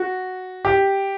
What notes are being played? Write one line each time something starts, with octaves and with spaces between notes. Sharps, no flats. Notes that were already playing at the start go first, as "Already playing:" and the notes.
Already playing: F#4
G4